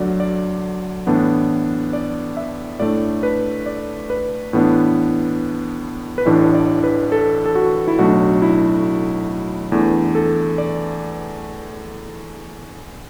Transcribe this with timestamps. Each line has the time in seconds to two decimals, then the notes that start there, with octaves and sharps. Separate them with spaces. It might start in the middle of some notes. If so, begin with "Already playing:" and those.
Already playing: D2 D3 F#3 D5
0.20 D5
1.07 A2 E3 B3 D4
1.93 D5
2.37 E5
2.80 A2 A3 D4 D5
3.23 B4
3.66 D5
4.10 B4
4.53 A2 E3 B3 D4
6.18 B4
6.26 A1 A2 E3 D4 D5
6.55 D5
6.84 B4
7.12 A4
7.46 A4
7.55 F#4
7.87 E4
7.99 B1 A2 A3 D4 F#4
8.42 E4
9.72 E2 E3 A3 D4
10.15 A4
10.58 D5